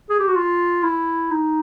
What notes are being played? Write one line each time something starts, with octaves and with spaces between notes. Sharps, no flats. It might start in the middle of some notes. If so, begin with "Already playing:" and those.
G#4
G4
F#4
F4
E4
D#4